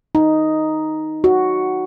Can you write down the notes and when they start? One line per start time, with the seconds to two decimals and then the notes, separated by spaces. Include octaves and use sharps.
0.15 D#4
1.24 F#4